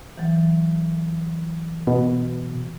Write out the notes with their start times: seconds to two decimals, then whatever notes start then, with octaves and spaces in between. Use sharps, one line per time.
0.17 E3 F#3
1.87 B2